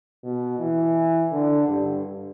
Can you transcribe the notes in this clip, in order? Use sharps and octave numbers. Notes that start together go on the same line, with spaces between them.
B2
E3
D3
G2